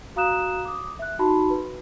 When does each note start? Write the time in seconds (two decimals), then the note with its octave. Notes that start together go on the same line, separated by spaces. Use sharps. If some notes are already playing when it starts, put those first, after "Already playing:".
0.16 F#4 F5 A#5 D#6 F#6 E7
0.65 D6 D#6
0.99 E5 F#6
1.19 D#4 F#4 A5 B5 C6
1.50 B4